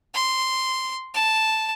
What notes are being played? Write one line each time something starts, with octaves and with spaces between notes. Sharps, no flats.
C6
A5